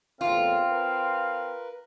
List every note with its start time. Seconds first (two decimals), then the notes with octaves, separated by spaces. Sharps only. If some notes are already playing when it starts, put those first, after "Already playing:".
0.21 E2 A2 C4 F4 A#4 F5
0.70 A#4 B4